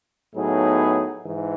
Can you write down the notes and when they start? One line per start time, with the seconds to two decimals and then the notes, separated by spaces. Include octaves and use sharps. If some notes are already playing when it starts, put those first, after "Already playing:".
0.35 A2 F#3 B3 D#4 G#4
1.25 G#2 E3